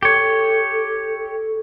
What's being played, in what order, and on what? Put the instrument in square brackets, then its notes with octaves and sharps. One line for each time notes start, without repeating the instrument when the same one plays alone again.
[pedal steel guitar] G4 C#5 [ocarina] A4